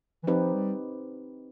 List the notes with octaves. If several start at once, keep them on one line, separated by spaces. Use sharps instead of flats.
E3
F3 C4 D#4 G4 B4
G3